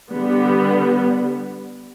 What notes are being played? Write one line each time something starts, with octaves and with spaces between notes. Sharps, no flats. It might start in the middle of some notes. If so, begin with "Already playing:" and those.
D3 G3 B3